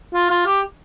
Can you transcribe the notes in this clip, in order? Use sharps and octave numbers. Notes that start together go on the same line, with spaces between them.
F4
F4
G4